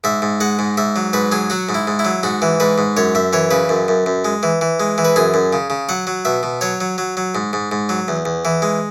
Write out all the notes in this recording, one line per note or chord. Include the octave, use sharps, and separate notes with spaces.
G#2 E5
G#2
G#3 F#5
G#2
G#2 E5
F#3
G#2 B4
F#3 G#4
F#3 F#4
G#2
E4
G#2
E4
F#3
G#2 F#4
E3
G#2 B4
G#2
F#2 C#5
F#2 E5
E3 C#5
C#3 B4
F#2
F#2
F#2
G#3
E3
E3
G#3
E3
B4
F#2 G#4
F#2
C#3
C#3
F#3 F#5
F#3
B2 E5
B2
F#3 C#5
F#3
F#3
F#3
G#2
G#2
G#2
F#3
E2
E2
E3
G#3